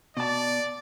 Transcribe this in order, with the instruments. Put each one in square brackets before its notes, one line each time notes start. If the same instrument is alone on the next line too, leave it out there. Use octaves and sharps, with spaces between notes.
[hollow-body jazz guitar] B2 A5 [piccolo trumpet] D5